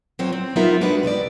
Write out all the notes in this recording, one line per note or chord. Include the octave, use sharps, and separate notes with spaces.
F#3 A#3 C4 F4 C5 C#5
C4
F#3 B3 D#4 F4 A#4 E5
G#3 D4 D#4 F#4 B4
C3 B3 G4 D5